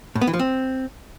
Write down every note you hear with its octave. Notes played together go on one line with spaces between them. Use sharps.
A2
B3
E3
F3
C4